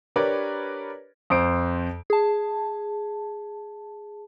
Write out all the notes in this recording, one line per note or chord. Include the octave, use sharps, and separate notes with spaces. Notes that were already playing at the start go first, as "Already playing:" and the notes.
D4 G4 A#4 B4 C#5 D5
F2 C5 D7
G#4 A5